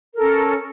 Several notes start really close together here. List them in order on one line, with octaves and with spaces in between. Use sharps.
A#4 A4 C#4